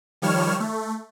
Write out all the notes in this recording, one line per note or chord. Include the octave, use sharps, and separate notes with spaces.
D#3 F3 G3 C#5 F6 E7
A3